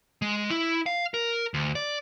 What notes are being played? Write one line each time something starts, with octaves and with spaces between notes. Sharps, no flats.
G#3
E4
F5
A#4
D2
D5